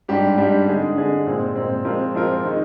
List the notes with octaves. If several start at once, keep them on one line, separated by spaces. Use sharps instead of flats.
G#2 G3 D4 G4
G#2 G3 D4 G4
D3 G#3 D#4 G#4
D3 G#3 D#4 G#4
A#2 G#3 C4
A#2 G#3 C4
F3 G#3 C4 F4 A#4
F3 G#3 C4 F4 A#4
D#3 G#3 D#4